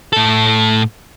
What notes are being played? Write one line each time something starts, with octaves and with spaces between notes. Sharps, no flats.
A2 A4